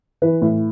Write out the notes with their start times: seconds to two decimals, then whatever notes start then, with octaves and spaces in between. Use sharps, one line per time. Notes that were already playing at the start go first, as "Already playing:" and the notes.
0.22 E3 B4
0.42 A2